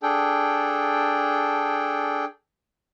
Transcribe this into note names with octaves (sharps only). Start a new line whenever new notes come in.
D4 G#4 A4 G5